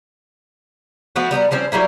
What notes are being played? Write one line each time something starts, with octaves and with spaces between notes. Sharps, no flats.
F3 A3 B3 F#4
G3 B3 D#4 A#5
F3 G3 C4 C#4
F#3 G3 A#3 E4